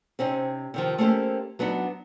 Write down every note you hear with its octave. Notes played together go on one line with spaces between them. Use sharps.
C3 C4 C#4 D#4
C3 D#3 F3
A3 A#3 C4 C#4 G4 C5
F#3 B3 D4 D#4